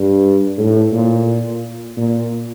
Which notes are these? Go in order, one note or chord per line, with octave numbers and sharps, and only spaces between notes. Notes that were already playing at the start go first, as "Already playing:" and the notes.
Already playing: G2
A2
A#2
A#2